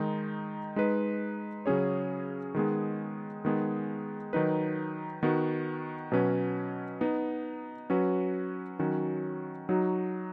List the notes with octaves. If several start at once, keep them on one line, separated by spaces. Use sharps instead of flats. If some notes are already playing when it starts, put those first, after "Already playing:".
Already playing: D#3 G#3 D#4
G#3 D#4 B4
C#3 F#3 C#4 G#4 C#5
D#3 G#3 B3 G#4
D#3 G#3 B3 G#4
D#3 F#3 D#4 B4
D#3 B3 F#4
B2 F#3 C#4 B4
B3 D#4 B4
F#3 C#4 F#4 B4
D#3 F#3 C#4 F#4
F#3 D#4 F#4